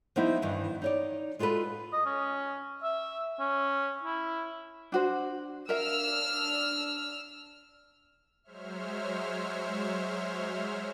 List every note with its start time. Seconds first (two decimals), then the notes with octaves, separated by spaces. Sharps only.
0.16 F3 G3 B3 C4 D#4 E4
0.42 G2 D#3 E3
0.82 D#4 C#5 D5
1.39 G#3 F4 F#4 A4 B4
1.93 D#5
2.06 C#4
2.83 E5
3.40 C#4
4.03 E4
4.92 D4 F#4 C5
5.69 D4 A#4 E5 F5 E6 F6
8.43 F#3 G#3 C5 C#5 E5 F6